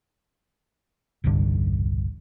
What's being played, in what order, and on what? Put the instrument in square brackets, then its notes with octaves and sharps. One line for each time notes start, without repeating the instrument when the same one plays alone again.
[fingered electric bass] E1 C2 G2 D3